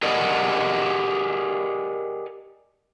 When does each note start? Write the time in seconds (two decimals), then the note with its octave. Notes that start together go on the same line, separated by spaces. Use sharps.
0.03 G4 G#4 A#4 D5 D#5 F#5